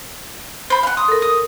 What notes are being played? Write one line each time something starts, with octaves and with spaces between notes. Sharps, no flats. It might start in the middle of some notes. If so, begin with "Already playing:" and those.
C5 B5
F5 F#5
C6 D#6
A4 A#4
D#6